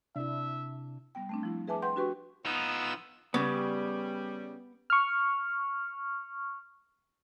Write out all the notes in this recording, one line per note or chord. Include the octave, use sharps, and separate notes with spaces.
C3 D4 E4 E5
G3 B3 G5
A3 C4 D4
F3 E4
G#4 B4 E5 G#5 A5 D6
B4 F#5 G5 C6 G6
D4 F#4 G4 B4 G5 C#6
F3 B3 D#4 E6
C#3 G3 B3
C#6 F6